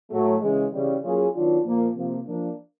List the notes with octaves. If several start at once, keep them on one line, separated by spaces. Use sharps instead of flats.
A2 F#3 A3
C#3 E3 G#3
C#3 E3 G3
F#3 A#3 C#4 F4 G#4
D#3 F#3 B3 D4 F4
A#2 F3 A#3
C3 F3 A#3
F3 A#3 D4